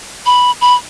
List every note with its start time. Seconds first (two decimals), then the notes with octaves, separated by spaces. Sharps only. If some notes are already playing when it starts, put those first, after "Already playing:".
0.26 B5
0.61 B5